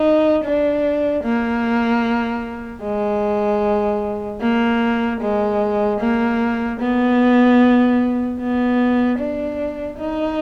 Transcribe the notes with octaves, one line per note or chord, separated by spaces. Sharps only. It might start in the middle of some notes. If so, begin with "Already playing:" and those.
Already playing: D#4
D4
A#3
G#3
A#3
G#3
A#3
B3
B3
D4
D#4